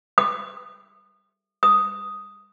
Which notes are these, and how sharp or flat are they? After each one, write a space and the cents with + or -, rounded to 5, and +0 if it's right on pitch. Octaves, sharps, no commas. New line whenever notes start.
D#6 -30
D#6 +0